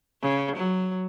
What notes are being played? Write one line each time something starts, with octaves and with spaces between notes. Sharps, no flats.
C#3
F#3